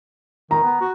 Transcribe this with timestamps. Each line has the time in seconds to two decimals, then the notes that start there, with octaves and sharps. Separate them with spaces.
0.51 D#3 A#5
0.63 B3
0.81 F#4